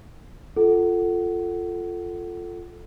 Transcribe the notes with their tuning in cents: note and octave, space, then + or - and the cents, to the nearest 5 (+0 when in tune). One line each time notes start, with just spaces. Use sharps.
F4 +0 A4 +0 F#5 +20